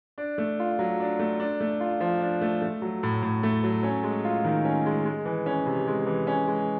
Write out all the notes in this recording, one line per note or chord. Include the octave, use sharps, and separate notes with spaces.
D4
A3
F4
F#3
D4
A3
D4
A3
F4
F3
D4
A3
A3
F#3
A2
A2
A3
F#3
C#4
G#3
F4
D#3
C#4
G#3
G#3
E3
C#4
C3
G#3
E3
C#4
G#3